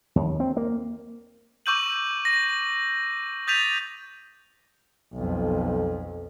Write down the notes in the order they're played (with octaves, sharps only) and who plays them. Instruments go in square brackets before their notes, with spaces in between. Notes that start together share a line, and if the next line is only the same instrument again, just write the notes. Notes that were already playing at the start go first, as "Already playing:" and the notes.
[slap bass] D#2
C4
A#3
[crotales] C#6 D6 E6 G6 D#7 F#7
A#6
D#6 G6 A6 B6 D#7 F7
[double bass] B1 F2